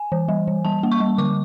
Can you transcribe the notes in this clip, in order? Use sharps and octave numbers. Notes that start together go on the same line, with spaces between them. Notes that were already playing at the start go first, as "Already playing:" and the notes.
Already playing: G#5
E3
G3
E3
G3 A5
A#3
C#6
G3
D3 D6